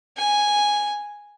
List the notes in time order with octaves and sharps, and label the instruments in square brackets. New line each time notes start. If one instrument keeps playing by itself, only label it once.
[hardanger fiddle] G#5